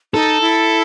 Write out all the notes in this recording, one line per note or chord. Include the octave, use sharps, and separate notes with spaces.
D#4 A4
E4